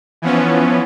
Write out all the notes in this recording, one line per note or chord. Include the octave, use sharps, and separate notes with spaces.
E3 F3 B3 C#4